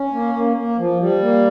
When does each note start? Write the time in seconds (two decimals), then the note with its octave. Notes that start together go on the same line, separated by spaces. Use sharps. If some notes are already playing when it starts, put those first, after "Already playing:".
Already playing: C#4
0.13 A#3
0.35 A#3
0.57 A#3
0.78 F3
1.00 G3
1.21 A#3